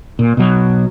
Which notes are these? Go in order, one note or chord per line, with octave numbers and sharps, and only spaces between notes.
A#2
B2 F#3